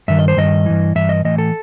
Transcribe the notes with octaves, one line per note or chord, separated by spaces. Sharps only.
G2 D#3 E5
D#5
C5
G2 D#3 D#5
G2 E3
G2 E3 E5
D#5
A2 E3 D#5
A4